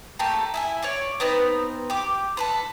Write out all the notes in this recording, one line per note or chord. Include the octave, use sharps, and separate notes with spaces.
A3 A#3 G4 A4
E4 E5 G#5
C#5 D5 C#6
B3 C4 D#4 B4
G4 D6
A4 B4 C5